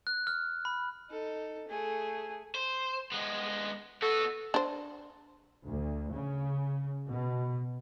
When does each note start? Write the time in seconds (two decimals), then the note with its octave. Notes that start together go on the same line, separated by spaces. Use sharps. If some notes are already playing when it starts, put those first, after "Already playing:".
0.07 F#6
0.27 F6
0.65 B5
1.10 D#4 A4
1.68 A3 G#4
2.55 C5
3.12 G#3 B3
4.02 B3 F#4 A4
4.54 D4 C5
5.63 D2
6.11 C#3
7.08 B2